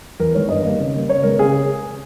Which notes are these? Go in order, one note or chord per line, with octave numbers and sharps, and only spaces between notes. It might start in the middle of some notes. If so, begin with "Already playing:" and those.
E2 A#4
D#3 G#3 B3 C#5
G2 D#5
D#3 G3 A#3
C#3
G3 A#3
C#3 C#5
G#3 B3 A#4
C#3 G#4